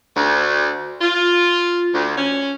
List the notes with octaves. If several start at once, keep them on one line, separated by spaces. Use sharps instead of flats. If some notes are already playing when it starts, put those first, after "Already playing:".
D2
F4
D2
C#4